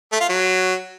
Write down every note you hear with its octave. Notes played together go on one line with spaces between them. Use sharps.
A3
F4
F#3